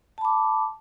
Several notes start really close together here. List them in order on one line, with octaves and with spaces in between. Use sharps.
A5 B5 D6